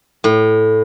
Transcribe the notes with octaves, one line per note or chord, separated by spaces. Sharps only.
A2